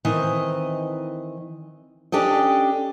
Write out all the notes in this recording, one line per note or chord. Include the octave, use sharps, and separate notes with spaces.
D#3 E3 C4 D#5
C#4 D4 G4 A4 D#5